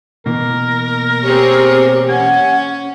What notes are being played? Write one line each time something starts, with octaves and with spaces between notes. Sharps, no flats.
B2 E3 A#3 A#4
C4 G4 G#4 C#5
C#4 F#5 G#5